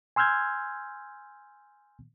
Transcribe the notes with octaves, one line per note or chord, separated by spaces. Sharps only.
G#5 C6 E6 F6 G6 G#6